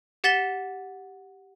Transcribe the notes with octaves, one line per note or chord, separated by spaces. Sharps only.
G4 F#5 A6 B6 E7 G7